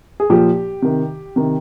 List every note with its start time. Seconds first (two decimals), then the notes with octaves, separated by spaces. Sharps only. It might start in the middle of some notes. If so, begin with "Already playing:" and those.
0.20 G#4
0.30 A#2 F3 G4
0.82 C3 D#3
1.36 C3 D#3